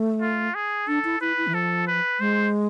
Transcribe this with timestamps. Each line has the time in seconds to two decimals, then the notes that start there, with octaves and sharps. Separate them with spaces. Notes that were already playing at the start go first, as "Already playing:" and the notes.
Already playing: A3
0.21 F4
0.55 G#4
0.88 D4 A4
1.04 E4
1.21 E4 B4
1.37 E4
1.47 E3
1.53 F3 A4
1.87 B4
2.20 G#3 C5